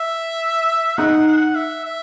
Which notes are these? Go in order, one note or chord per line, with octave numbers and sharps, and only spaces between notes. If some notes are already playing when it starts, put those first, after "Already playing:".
Already playing: E5
D#4 F#5
F#5
E5
E5